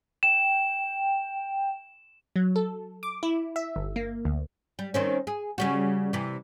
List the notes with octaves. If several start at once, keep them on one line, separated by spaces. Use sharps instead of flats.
G5 E7
F#3
A4
D6
E4
E5
G1
A#3
D2
G3
D#3 C4 C#4
G#4
C#3 G3 F#4
C3 E3